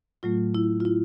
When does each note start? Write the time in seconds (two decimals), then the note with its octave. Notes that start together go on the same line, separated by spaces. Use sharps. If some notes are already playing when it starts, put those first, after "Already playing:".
0.23 A2 F#3 A3 F4
0.55 E4
0.80 F4
0.85 E4